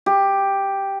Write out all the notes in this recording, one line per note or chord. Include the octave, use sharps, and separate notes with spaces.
G4